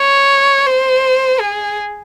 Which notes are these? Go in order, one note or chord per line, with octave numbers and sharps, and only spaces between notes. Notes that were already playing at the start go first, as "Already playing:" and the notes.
Already playing: C#5
C5
G#4